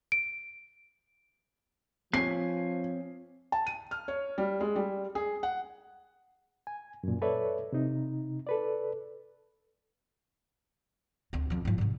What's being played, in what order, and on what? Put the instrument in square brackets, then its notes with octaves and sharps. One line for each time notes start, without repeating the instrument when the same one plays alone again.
[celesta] D7
[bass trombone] F3 [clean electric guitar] C4 C#5 G#5 [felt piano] C7
[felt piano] A5
D#7
F6
C#5
G3
G#3
G3
G#4
F#5
[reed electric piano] G#5
F#2 A#2
A4 B4 C#5 D5 E5
C3 D#4
A4 B4 D5
[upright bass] D2 C4
F2 F3
G#2 F3
G#2 C3